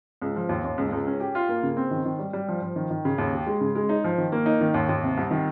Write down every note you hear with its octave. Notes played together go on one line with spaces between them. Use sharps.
C#2
F3
D#2
D#2
C#2
C#2
C#4
G4
F4
A#3
C#3
C4
D#3
D#3
G3
G3
F3
F3
D#3
D#3
C#3
D#2
G4
G#3
C#3
G#3
D#4
F3
D#3
A#3
D#4
D#3
D#2
D#2
C3
C2
D#3